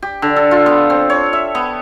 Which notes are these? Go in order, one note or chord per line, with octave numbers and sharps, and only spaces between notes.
G4
D3
A4
F4
B3
C4
C#5
E5
B3